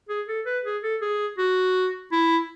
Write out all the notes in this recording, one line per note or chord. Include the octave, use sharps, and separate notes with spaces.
G#4
A4
B4
G#4
A4
G#4
F#4
E4